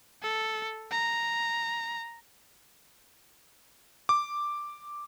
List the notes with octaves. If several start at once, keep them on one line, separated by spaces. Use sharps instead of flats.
A4
A#5
D6